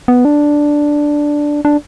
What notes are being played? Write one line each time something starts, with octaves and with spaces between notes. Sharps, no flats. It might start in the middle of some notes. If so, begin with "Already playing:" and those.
B3
D4
D4